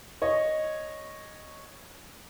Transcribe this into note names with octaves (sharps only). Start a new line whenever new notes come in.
C#5 D#5